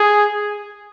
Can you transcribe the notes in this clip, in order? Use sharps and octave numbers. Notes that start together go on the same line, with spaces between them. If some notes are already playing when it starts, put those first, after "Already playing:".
Already playing: G#4